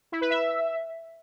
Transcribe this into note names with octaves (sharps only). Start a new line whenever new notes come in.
E4
B4
E5